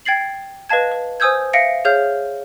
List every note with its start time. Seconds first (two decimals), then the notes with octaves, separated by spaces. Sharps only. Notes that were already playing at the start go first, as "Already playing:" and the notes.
0.05 G5 G#6 A6 C7 F#7
0.69 B4 D#5 F5 A5 G#6
0.92 B4
1.20 C5 G#5 D#6 E6 G6 G#6
1.53 E5 F5 A#6 C#7 D7
1.85 G#4 C#5 F5 F6 G6